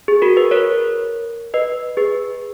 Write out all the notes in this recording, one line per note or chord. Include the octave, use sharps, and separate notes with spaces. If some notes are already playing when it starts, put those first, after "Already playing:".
G#4
F#4 A#4
G#4 B4
A#4 C#5
B4 D#5
G#4 B4